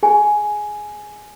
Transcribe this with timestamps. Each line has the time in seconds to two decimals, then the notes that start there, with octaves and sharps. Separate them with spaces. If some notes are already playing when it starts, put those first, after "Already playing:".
0.03 G#4 G#5